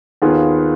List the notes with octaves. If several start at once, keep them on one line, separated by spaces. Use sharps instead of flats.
D#2 D#3 B3 F4 G#4